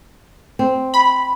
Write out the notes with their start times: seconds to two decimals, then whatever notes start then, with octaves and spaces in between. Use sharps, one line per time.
0.59 C4
0.94 B5